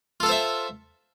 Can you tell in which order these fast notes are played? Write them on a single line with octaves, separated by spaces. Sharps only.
F4 A4 F5 C5 E5